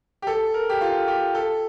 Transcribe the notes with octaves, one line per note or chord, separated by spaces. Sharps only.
G4
A4
A#4
G4
F4
G4
A4